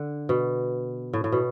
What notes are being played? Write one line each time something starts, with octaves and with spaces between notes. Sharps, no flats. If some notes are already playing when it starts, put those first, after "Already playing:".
Already playing: D3
B2
A2
A2
B2